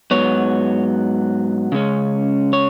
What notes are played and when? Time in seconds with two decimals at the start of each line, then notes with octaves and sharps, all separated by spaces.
0.11 G#2 F#3 B3 C#5
1.72 C#3 G#3 C#4
2.53 C#5